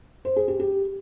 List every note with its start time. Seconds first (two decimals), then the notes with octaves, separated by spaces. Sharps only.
0.25 C5
0.36 G#4
0.48 G4
0.60 G4